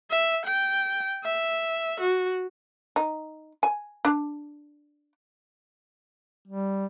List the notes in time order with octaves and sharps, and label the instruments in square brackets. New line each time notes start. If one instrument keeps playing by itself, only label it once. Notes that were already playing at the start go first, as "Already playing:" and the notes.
[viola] E5
G5
E5
F#4
[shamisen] D#4
G#5
D4
[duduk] G3